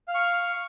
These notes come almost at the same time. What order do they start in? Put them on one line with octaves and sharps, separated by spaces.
F5 F6 C#6